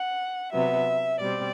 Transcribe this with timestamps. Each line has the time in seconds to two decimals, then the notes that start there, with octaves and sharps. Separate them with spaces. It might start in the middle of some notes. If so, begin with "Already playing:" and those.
Already playing: F#5
0.52 C3 F#3 B3 E5
1.20 B2 G3 C4 D5